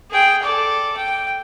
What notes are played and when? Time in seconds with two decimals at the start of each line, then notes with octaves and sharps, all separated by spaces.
0.11 G#4 G5
0.43 A4 D5
0.97 G5